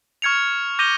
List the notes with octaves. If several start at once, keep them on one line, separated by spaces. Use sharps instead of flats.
C#6 F6 G#6 C#7 F7
D6 G6 A#6 D#7 G7